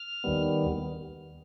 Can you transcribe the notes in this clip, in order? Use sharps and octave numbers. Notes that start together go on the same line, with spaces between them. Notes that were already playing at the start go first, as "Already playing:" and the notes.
Already playing: F6
D#2 D#3 G3 B3